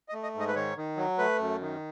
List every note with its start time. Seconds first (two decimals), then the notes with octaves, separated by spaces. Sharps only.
0.09 D#5
0.13 A3
0.23 D#5
0.35 G#2
0.40 D#5
0.48 B4
0.55 D#3 C#5
0.76 D#3
0.97 F#3
1.18 A3 B4
1.38 F#2
1.61 D#3